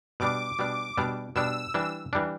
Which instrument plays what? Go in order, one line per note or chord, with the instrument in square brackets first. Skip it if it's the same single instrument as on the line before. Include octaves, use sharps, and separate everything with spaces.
[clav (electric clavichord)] B2 G3 D4 [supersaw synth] D6
[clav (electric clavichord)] B2 G3 D4
B2 G3 D4
[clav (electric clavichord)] B2 G3 D4 [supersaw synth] E6
[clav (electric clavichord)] E3 G3 D4
E3 G3 D4